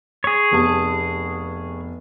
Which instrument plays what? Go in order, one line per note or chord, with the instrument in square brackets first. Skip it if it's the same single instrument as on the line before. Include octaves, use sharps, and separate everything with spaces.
[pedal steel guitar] G#4 C#5
[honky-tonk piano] F1 B3 A5